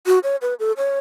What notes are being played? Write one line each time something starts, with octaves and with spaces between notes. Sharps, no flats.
F#4
C#5
B4
A4
C#5